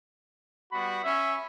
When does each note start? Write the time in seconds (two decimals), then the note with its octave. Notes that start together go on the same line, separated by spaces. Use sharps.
0.72 G3 B3 F#4 B5
1.04 C#4 E5